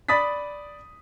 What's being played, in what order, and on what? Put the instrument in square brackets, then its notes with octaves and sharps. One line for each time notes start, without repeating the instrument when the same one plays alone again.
[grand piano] D5 B5 D#6 A6 B6